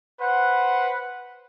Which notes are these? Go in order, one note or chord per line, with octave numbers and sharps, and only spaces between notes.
B4 C5 F#5